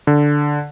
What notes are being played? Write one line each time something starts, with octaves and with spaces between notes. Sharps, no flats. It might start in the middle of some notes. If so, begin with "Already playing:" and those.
D3